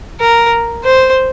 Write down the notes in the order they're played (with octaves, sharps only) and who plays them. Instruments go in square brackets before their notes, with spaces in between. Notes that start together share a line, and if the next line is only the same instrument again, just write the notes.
[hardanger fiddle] A#4
C5